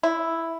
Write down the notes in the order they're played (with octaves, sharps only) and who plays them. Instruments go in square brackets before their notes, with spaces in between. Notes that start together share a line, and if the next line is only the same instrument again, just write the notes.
[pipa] E4